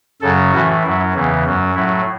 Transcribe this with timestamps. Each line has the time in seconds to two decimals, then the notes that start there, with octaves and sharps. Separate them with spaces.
0.21 F#2 C#3 F#3 A4
0.52 A2 E3 F#4
0.83 F#2 F#3 E4
1.14 E2 C#3 E3
1.44 F#2 F#3
1.75 A2 F#3 E4